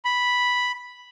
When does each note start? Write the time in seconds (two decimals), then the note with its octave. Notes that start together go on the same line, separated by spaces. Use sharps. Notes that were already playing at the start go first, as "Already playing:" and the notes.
0.05 B5